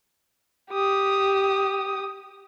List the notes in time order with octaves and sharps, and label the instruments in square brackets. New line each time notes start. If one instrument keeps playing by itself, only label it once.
[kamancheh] G4 D#6